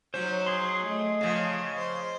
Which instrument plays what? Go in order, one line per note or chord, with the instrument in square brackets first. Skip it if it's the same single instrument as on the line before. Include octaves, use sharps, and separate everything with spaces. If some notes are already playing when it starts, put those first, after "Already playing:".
[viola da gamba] F#3 D#4 [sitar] C#4 [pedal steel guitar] C5
[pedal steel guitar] G#4 C6
[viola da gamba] A3 [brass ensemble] D#5
[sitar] C#3 F3
[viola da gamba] C5